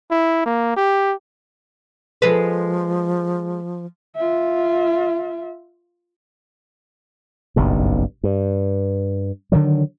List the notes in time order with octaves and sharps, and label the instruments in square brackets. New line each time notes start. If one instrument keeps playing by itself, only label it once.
[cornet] E4
A#3
G4
[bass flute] F3 [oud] G#3 A4 B4
[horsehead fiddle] F4 E5
[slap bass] F#1 B1 G2
G2
D3 D#3 F#3